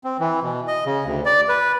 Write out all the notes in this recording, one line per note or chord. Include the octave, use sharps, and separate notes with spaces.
C4
E3
B2
D#5
C#3
D2
D5
B4